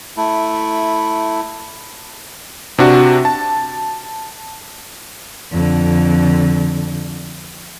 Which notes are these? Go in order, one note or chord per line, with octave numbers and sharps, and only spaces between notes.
A3 E4
C3 D4 F#4
A5
F2 D3